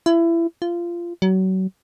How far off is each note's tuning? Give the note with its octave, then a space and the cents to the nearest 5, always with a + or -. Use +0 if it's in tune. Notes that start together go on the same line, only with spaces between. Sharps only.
E4 +25
F4 -20
F#3 +30